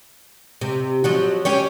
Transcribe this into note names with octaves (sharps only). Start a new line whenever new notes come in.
C3
F3 F#3 F#4
C#4 G4 C#5